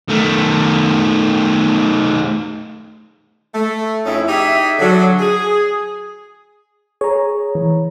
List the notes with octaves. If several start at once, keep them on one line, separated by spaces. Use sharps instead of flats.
D#3 A3
A3
F2 C#4 D#4 E4
D#4 G4 G#4 E5
D3 F#3
G#4
G#4 C#5 A#5
E3